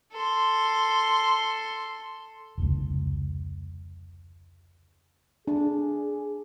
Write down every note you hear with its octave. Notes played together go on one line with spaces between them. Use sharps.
A4 C6
F1 C#2
D4 G#4